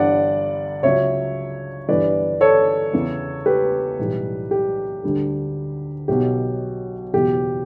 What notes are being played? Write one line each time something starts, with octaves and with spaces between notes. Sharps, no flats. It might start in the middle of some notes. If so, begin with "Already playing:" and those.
Already playing: G1 G2 E3 G3 D5 F#5
C#2 C#3 F#3 C#5 E5
G1 G2 E3 G3 B4 D5
A4 C#5
E2 C#3 E3
G4 B4
B1 A2 E3 G3
G4
D2 D3 G3
B1 B2 F#3 G4
F#1 E2 B2 F#3 G4